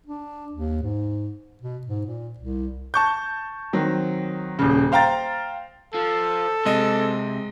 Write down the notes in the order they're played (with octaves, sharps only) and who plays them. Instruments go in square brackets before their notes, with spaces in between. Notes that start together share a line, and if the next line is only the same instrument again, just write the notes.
[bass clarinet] D4
D#2
G#2
B2
G#2
A#2
C2
[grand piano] A5 C#6 G6
D#3 F#3 C4
D#1 C#3
C5 F5 G5 A#5 A6
[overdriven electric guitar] F3 [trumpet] A4
[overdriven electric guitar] C3 [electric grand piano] G#3 D#5